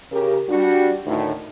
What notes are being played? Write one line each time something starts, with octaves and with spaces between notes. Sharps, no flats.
C#3 G4 A#4
G3 D4 F#4
D2 A2 D#3